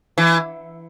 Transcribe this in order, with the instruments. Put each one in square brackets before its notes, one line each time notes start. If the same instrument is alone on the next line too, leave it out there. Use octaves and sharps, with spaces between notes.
[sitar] E3